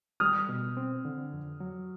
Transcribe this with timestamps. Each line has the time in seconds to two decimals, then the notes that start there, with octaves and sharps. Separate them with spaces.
0.20 G3 D#6 F6
0.49 B2
0.77 C4
1.05 D3
1.33 F2
1.60 F#3